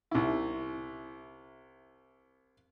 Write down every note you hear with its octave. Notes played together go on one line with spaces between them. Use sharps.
C2 E4